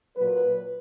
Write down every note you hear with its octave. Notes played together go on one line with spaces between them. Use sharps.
A#2 F#3 B4